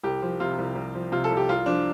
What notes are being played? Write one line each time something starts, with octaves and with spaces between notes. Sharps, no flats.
C2 G4
F3
C3 F4
C2
C2
F3
C3 F4
A4
C2
G4
C2 F4
F3 D4